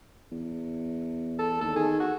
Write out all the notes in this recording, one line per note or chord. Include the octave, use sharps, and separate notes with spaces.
E2
A4
D#2 A4
D#3 G#4
F#4